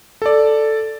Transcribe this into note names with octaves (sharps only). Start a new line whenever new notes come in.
A4 D5